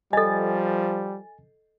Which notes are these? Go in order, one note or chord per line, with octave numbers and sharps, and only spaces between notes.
F3 G3 A4 D#5 G#5 A6